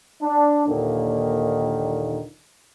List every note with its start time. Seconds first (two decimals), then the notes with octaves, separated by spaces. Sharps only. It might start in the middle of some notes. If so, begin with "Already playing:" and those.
0.21 D4
0.66 D#2 A#2 D3 D#3